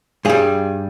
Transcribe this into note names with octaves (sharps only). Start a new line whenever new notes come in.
G2 G3 G#4